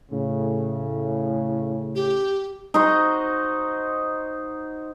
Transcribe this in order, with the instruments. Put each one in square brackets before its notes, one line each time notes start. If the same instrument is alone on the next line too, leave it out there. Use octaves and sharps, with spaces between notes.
[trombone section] A2 C#3
[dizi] G4
[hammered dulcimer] D#4 F#4 C5 D#5